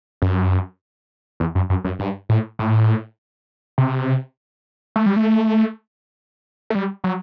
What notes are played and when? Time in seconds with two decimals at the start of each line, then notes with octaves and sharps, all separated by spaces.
0.22 F#2
1.40 E2
1.55 F#2
1.70 F#2
1.84 F#2
1.99 G2
2.29 A2
2.59 A2
3.78 C3
4.96 A3
5.06 G3
5.16 A3
6.70 A3
6.75 G3
7.04 F#3